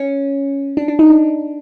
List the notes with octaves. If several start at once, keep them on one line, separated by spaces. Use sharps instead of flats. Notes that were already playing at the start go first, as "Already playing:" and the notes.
Already playing: C#4
D4
D4
D#4
D4